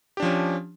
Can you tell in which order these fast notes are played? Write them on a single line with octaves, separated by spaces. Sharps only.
G4 D4 F3 C#4